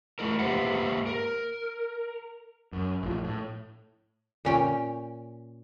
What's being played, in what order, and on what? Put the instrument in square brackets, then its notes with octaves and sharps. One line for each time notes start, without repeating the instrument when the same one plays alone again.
[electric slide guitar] A3 E4 A#4
A#3 G4 B4 C5 E5 F#5
A#4
[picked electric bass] F#2
A#1 A2 F3
A2
[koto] A#2 C#4 G5